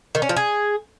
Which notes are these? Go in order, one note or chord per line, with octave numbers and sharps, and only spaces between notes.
D#3
C#4
F3
G#4